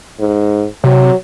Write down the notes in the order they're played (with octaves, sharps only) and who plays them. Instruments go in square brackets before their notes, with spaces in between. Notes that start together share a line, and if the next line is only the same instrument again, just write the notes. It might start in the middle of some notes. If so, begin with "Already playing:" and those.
[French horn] G#2
[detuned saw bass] C3 [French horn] F#3